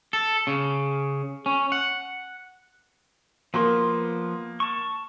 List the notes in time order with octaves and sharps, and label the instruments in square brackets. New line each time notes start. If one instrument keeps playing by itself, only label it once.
[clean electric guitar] A4
C#3
C#4
F#5
[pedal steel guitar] F3 B3 C6 [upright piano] A#3
[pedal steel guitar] A5 C#6